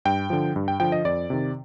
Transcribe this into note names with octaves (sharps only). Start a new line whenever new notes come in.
G2 G5
D3 F3
G2
G5
D3 F3 G5
D#5
F2 D5
C3 D#3